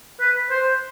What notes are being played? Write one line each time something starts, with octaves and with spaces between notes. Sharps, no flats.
B4
C5